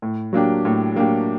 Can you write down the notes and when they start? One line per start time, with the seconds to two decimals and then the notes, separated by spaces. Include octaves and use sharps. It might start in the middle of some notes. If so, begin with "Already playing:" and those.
0.02 A2
0.33 F#3 A#3 D4 G4
0.65 A2
0.96 F#3 A#3 D4 G4